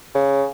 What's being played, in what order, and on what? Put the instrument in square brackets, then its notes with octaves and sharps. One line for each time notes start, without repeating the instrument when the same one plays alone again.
[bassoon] C#3